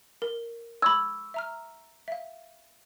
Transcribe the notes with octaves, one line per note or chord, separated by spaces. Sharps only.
A#4
B5 C#6 E6 G#6
E5 A#5 F6
E5 F5